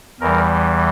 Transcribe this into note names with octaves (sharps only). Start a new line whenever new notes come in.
E2 E3 G3 A#4